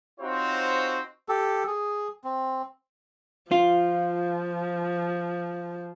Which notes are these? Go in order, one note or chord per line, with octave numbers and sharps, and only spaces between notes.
C4 D#4 F4 F#4 C5 C#5
G4 A4
G#4
C4
F3 F4